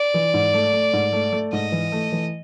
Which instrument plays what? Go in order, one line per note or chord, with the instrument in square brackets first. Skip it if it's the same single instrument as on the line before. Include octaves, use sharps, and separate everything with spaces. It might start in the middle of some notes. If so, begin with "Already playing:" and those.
Already playing: [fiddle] D5
[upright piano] E3
G#2
A3
A3
G#2
A3
A3
[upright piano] G#2 [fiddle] D#5
[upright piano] E3
A3
E3